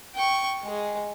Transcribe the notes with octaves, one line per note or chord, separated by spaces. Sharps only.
G5 C#6
G#3 G#4